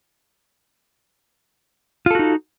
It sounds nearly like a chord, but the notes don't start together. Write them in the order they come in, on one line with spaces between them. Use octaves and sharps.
F4 A4 F#4 D#4